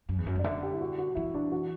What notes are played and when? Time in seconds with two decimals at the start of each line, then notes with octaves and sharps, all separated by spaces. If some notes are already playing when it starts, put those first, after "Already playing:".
0.09 F#2
0.18 E2
0.26 F#2
0.36 G2
0.39 D5
0.44 D3 E5
0.63 G4
0.73 E4
0.81 F#4
0.98 F#4
1.15 E3 E4
1.34 D4
1.52 F#4